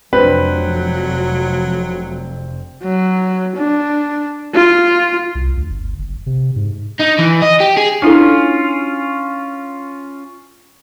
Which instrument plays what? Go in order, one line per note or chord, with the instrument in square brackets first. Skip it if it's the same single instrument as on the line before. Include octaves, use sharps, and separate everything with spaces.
[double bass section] F1 F2 [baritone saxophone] F#3 [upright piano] C4 D4 [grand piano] B4
[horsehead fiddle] F#3
D4
F4
[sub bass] C2
D2
G1
F#1
C3
G#2
[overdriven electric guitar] D#4
E3
D#5
G4
G#4
[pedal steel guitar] C#4 F4 [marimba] D4 E4 A4